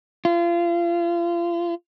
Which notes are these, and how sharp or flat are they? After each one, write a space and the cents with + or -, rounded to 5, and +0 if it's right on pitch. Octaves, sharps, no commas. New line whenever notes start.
F4 -30